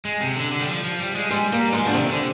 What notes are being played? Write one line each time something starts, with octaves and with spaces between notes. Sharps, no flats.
G#3
C3
D3
D3
G3
F3
F3
G3
G#3
G3 G#3
G3 A#3
F3 G#3
D3
C3 D#3
D3